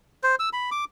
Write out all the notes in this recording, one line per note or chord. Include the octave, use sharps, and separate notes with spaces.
C5
E6
B5
D6